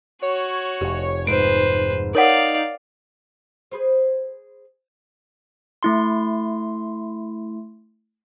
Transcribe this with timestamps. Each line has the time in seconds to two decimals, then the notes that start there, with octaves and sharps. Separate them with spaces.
0.22 F#4 C#5
0.81 F1 G4
1.27 G#2 B4 C5 D7
2.15 D#4 A#4 C#5 D5 F5 F#5
3.71 G#4 B4 C5
5.83 A3 E4 C6